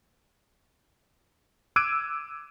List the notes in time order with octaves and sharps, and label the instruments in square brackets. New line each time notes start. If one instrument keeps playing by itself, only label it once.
[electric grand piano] D6 E6 F#6 G#6 D7 D#7